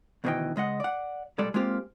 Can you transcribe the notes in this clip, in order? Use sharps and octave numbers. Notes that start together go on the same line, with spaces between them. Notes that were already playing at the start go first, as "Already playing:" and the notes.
D2 B2 D#3 E3 D#5 G5
C#2 G#3 D#5 F#5
D5 F#5
B1 A#2 G3 G#3 A4 D5
G#3 A#3 C4 F4 G4